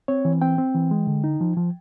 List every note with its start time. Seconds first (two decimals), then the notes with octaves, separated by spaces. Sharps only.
0.08 C4 C#5
0.25 E3
0.42 C4 G5
0.58 C4
0.74 E3
0.91 G#3
1.07 D3
1.24 D#4
1.41 F3
1.57 F3